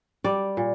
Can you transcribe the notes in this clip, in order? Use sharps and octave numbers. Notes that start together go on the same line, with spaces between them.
G3 D5
A#2